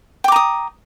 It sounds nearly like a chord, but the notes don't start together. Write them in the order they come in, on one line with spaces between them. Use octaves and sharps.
G5 D6 A#5 D#6